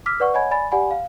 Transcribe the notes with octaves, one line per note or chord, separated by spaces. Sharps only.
D6 E6 F6 B6
B4 D5 F#5 C#6
C#5 D#5 F#5 G#5 B5 G#6
D5 G#5 B5 A6
G4 D5 F#5 G#5 B5
F5